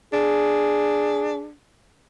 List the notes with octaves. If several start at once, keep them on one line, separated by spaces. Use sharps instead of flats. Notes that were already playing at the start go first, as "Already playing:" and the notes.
D4 G#4